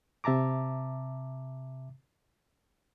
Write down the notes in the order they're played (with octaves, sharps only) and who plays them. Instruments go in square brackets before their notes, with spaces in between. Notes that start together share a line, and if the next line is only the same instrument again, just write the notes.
[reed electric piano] C3 E5 A5 A#5 D6